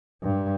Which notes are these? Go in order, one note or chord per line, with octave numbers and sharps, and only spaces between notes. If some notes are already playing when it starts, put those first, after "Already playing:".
G2